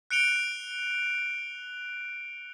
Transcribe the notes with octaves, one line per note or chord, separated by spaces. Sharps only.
F#6 C#7 D7 F7 G7